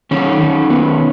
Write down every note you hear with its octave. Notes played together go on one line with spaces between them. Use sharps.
D#3 C#4
D#3
B3